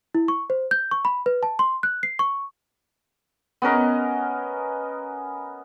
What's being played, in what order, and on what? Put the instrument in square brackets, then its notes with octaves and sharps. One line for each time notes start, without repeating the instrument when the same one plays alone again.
[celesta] E4
C#6
C5
G6
C#6
B5
B4
A5
C6
F#6
C7
C#6
[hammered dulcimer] B3 C#4 A#4 D#5